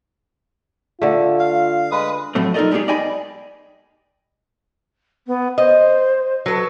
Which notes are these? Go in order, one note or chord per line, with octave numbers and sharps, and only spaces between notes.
D3 A3 F4
F5
G#3 B4 D#6
A2 F3 F#3 A3 C4
D#4 F4 A4 A#4 D5 D#5
G3 G#3 B3 D#4 G4 G#4
D5 D#5 G5 G#5 B5
B3
C5 D#5
F#3 A4 B4